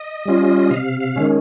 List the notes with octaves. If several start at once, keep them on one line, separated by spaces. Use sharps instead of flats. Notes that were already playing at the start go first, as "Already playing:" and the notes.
Already playing: D#5
G3 C#4 F4
C3 F5
F5
D#3 G#3 C#4